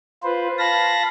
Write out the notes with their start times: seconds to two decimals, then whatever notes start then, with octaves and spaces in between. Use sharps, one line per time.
0.23 F4 B4 C5
0.59 F5 A5 B5 A#6